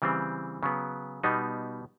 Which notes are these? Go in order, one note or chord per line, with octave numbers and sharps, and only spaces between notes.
C#3 E3 G3 C4
C#3 F#3 B3
B2 G3 B3 D#4